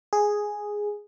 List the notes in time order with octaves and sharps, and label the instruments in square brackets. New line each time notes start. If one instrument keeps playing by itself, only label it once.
[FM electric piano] G#4